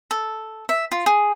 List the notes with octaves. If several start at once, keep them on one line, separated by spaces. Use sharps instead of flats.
A4
E5
F4
G#4